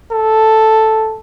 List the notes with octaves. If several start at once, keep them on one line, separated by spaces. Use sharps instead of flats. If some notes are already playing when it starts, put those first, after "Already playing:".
A4